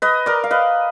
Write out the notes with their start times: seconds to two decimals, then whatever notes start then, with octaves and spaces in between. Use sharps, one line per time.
0.02 B4 D#5
0.26 A#4 D5
0.44 F5
0.51 B4 D#5